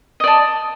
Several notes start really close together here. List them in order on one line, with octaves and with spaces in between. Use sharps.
D#5 D5 A5